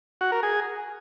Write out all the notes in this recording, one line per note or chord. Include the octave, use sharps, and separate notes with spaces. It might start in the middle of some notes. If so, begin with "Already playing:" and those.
F#4
A#4
G#4